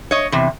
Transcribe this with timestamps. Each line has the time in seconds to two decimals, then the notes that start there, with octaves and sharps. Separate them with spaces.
0.11 C#5 D#5
0.32 E2 C3